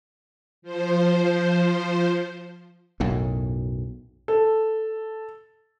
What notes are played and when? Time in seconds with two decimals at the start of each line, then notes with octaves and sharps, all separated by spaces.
0.62 F3 C5
3.00 B1 F#2 A2
4.28 A4